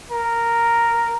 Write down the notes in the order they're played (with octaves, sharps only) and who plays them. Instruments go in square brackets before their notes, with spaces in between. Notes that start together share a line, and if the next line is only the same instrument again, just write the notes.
[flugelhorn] A#4